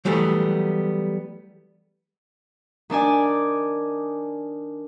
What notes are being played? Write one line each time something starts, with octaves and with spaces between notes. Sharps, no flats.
E3 F#3 G3 A3 B3
D#3 D4 D5 G#5